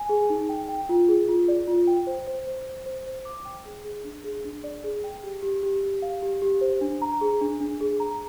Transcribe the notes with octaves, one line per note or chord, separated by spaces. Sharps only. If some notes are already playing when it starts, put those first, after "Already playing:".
Already playing: G#5
G#4
D#4
G5
G5
F4
G#4
F4
D5
F4
G5
C5
C5
C5
C5
C5
C5
D6
G5
G#4
G#4
D4
G#4
D4
D5
G#4
G5
G4
G4
G4
G4
F5
G4
G4
C5
D4
A#5
G#4
D4
D4
G#4
A#5